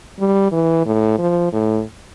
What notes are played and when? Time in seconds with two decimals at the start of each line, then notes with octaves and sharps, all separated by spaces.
0.19 G3
0.52 E3
0.86 A2
1.19 F3
1.52 A2